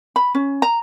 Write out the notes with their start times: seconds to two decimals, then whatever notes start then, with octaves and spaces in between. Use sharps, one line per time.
0.16 B5
0.35 C#4
0.62 A#5